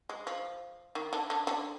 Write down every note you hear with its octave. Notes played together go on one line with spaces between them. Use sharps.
G#3
F3
D#3
D3
D3
D3